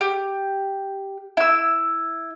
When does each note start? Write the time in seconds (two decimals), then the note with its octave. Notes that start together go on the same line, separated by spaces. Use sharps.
0.01 G4
1.37 E4 E6